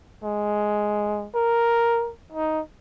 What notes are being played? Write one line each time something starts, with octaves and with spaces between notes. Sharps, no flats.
G#3
A#4
D#4